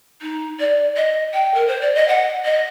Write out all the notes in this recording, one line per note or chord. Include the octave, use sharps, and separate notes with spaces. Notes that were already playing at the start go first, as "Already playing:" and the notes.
D#4
D5
D#5
G5
A#4
C5
D5
D#5
F#5
D#5